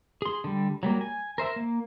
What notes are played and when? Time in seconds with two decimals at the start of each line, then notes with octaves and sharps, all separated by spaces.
0.22 G#4 C6
0.44 D3 G3
0.83 F#3 G3 A#3
1.01 G#5
1.38 A#4 C5 E5
1.56 A#3